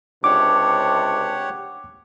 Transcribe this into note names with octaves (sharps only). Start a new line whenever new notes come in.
C#2 C3 D4 G4 C#5 F#5 D6